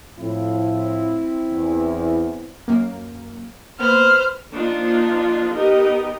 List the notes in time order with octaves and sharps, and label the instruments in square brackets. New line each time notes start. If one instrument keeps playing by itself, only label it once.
[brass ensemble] A2 F3 [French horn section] C4 E4
[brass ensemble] E2
[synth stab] F#2 A#3
[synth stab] A#3 B3 [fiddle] B4 C5 [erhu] F6
[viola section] F3 A#3 D4 D#4 F4
B3 D#4 G4 A#4 D#5